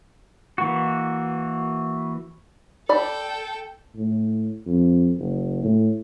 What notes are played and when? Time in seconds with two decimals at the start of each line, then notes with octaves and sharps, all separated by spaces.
0.58 E3 A#3 F#4
2.89 A4 D5 G5 B5
3.97 A2
4.66 F2
5.18 F#1
5.64 A2